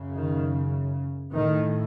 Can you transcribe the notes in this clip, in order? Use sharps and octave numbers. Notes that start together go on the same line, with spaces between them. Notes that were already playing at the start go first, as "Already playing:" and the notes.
Already playing: F#2 C#3
D#3
A2 D#3